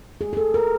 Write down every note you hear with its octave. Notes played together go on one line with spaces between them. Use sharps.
G#4
G#4
A4
A#4